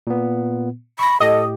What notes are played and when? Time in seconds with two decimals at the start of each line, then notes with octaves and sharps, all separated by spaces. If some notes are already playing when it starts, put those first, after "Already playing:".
0.07 A#2 B3
0.99 B5 C#6 A#6
1.20 A2 G4 A4 D#5